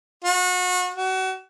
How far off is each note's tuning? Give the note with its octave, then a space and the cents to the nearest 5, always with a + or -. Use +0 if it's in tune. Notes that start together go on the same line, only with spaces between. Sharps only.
F#4 -35
F#4 +30